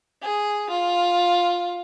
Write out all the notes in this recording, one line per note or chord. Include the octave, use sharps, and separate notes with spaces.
G#4
F4